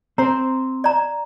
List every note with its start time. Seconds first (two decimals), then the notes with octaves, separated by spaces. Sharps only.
0.18 C4 C5 A#5
0.84 D5 A#5